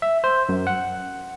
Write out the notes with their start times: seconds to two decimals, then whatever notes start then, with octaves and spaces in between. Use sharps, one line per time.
0.02 E5
0.24 C5
0.49 F#2
0.67 F#5